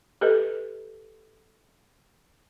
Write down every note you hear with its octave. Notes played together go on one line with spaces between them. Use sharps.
G4 A4 B4 D#5